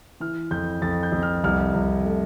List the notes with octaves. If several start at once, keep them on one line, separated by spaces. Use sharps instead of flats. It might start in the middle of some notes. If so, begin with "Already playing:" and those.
E3 F6
F2 G6
F2 A6
G6
F2
F6
C2 F6
C2
A3